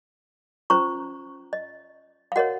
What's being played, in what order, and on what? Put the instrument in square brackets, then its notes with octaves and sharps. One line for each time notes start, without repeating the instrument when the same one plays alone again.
[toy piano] C#4 F4 C5 A#5 C#6
D#5
F5
F#4 A#4 C#5 D#5 F#5